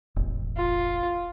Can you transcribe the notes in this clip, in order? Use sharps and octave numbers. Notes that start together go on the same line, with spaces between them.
E1 A1
F4